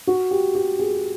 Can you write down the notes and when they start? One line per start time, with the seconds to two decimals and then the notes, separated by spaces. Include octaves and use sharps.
0.07 F#4
0.31 G4
0.55 G4
0.79 G#4